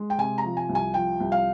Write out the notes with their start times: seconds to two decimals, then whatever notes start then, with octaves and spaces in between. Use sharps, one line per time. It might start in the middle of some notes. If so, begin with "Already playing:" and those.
Already playing: G#3
0.10 G5
0.18 C3 G#5
0.38 A#5
0.44 F3
0.57 G#5
0.69 C2
0.75 G#5
0.94 F3 G5
1.20 C2
1.32 F5